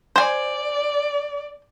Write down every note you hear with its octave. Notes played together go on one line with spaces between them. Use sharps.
C5 D5 G#5